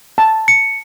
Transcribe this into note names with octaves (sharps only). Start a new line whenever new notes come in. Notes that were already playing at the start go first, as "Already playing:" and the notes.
A5
C#7